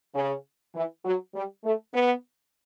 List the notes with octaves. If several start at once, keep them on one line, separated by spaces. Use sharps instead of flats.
C#3
E3
F#3
G3
A3
B3